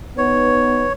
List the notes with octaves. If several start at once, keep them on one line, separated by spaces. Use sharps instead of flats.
B3 D#4 B4 C#5